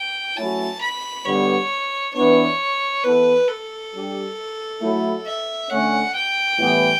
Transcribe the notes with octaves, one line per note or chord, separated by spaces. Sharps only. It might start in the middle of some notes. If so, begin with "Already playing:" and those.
Already playing: G5
F#3 A3 C#4 E4 A5
B5
D3 G3 B3 C#5
E3 B3 D4 C#5
E3 B3 E4 A4 B4
A4
G3 D4 G4
F#3 A3 E4
E5
D3 A3 C#4 F#5
G5
A2 E3 G3 B3